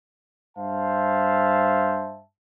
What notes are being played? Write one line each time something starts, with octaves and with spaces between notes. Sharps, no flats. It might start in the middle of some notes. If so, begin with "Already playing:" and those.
G2 C5 E5 F5 A5